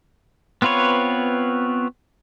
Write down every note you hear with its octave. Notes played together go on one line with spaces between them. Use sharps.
B3 C4 F4 B4 C#5